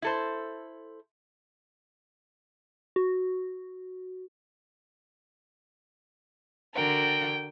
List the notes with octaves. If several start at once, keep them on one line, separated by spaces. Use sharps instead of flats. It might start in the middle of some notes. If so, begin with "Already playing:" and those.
E4 A4 C5
F#4
D3 F#4 A#4 G5